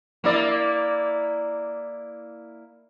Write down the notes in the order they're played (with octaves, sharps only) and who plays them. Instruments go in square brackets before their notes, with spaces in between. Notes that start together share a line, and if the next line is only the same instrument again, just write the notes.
[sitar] A#3 E4 D5